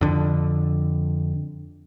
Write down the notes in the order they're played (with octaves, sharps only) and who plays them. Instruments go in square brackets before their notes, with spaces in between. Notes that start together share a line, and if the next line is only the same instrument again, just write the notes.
[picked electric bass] F2 D3